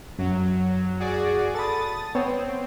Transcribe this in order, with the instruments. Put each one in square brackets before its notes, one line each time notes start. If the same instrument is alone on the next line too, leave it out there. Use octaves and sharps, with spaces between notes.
[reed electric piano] F#2 [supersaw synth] F#3
[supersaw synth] F#4 G#4 D5
[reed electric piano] A4 A5 B5 [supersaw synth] D#6 A6
[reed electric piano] B3 C#5 G5 [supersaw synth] C4